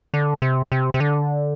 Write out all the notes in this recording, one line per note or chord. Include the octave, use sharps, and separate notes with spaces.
D3
C3
C3
C3
D3